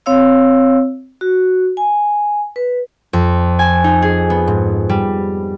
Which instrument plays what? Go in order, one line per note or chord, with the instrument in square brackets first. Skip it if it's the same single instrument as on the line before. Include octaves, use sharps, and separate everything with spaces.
[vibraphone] C4 C#5 F5 E6
F#4
G#5
B4
[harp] F2
G#5
D#4
G#4
B3
G#2
G3